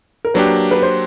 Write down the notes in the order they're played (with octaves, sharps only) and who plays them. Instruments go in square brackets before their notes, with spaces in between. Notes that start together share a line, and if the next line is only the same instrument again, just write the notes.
[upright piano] A#4
[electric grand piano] F#3 A#3 D4 G4 [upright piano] B4
[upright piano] B4
C5